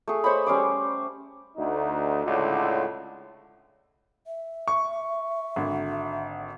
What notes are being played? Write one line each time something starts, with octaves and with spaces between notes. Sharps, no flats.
A3 G#4
C5 C#5 D#5 B5
G3 C#4 C5 D6
D2 D#4
C#2 A2 D3
E5
C#6
G#1 D3